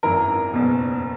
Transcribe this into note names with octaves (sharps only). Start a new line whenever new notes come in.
G#1 F#2 E3 A#4 A#5
F#1 E2 B2